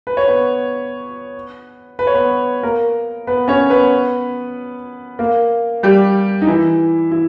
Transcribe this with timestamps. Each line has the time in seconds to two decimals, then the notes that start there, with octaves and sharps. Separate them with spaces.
0.07 B4
0.17 C#5
0.28 B3 B4
1.99 B4
2.07 C#5
2.14 B3 B4
2.62 A#3 A#4
3.27 B3 B4
3.48 C#4 C#5
3.70 B3 B4
5.19 A#3 A#4
5.83 G3 G4
6.42 D#4
6.47 E3 E4
7.11 E3 E4